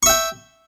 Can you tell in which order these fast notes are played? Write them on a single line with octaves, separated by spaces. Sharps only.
C#6 E5 G5